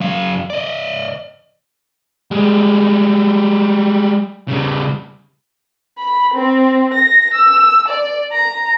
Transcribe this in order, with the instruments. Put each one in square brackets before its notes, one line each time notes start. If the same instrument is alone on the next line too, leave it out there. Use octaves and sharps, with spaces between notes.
[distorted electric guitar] F#2 F5
D5 D#5
G3 G#3
C#3 G3
[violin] B5
C4
A#6
E6
D5
A#5